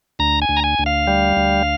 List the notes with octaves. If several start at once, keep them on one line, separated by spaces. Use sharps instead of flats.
D2 A#5
G#5
D2
A#5
G#5
D2
F5
G3
D2